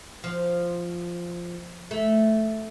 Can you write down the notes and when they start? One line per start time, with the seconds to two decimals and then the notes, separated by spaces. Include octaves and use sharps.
0.24 F3
1.91 A3